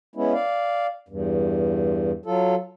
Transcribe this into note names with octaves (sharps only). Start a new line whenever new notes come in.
G#3 B3 C#4 E4
D5 F5
E2 G2
F#3 F4 A4